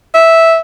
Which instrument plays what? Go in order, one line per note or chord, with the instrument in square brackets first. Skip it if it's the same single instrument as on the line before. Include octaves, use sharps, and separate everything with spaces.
[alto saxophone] E5